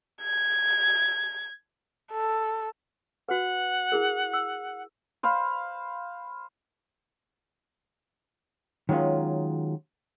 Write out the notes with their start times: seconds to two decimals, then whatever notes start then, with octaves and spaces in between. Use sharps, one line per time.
0.22 G#6
2.11 A4
3.29 F#4 B4 F#5
3.92 E4 G#4 A#4
4.33 E6
5.23 C5 F5 B5
8.89 D#3 F#3 G#3 C#4 F4